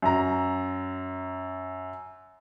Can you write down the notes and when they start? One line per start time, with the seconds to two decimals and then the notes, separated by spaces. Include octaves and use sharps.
0.02 F#2 A#5